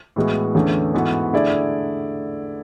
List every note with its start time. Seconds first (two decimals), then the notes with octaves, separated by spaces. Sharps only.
0.16 A2 E3 G#3 B3 F#4
0.55 E2 D3 A3 C#4 G#4
0.94 G#2 E3 B3 F#4 A4
1.33 D3 A3 E4 G#4 D5